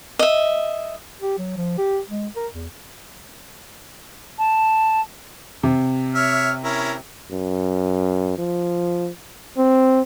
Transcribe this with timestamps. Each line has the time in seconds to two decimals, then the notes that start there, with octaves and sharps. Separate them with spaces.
0.19 D#5 E5
1.21 G4
1.38 F#3
1.57 F3
1.78 G4
2.10 G#3
2.36 A#4
2.53 E2
4.39 A5
5.63 C3
6.15 C#5 E5 F6
6.63 C#4 E4 A#4
7.31 F#2
8.38 F3
9.57 C4